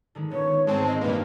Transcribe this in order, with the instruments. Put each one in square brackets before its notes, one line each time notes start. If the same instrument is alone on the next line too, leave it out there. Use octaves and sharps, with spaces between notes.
[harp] D3 D#3 G#3
[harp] A#2 B3 C#4 [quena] C#5
[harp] G#2 [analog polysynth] G#3 C4 [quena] A5
[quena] D#5
[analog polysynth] G2 A#2 A#3 [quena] B4